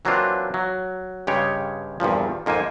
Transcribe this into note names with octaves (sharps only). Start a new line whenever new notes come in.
E3 F#3 A#3 C4 D4 F4
F#3
G2 C#3 G#3 G4 C#5
E2 G2 A#2 F3
F2 G#2 A#3 C5 G#5